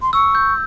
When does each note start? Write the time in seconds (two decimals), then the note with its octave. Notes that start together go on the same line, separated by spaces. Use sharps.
0.02 C6
0.13 C#6 E6
0.35 G6